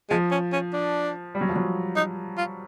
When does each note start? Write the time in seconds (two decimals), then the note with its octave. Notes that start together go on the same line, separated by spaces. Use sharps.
0.10 F3 G#3
0.31 C#4
0.53 C#4
0.73 D4
1.35 G3
1.41 F#3
1.49 F3
1.56 F#3
1.96 D#4
2.37 F4